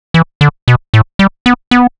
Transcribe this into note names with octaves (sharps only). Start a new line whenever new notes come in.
E3
D3
B2
A2
G3
B3
B3